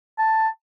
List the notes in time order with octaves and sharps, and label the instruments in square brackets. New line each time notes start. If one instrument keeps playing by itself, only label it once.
[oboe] A5